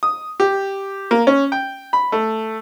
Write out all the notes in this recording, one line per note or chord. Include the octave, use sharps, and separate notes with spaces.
D#6
G4
A#3
C#4
G5
B5
A3